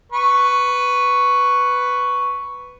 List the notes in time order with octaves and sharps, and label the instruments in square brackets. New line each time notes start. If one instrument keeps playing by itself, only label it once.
[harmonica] B4 C#6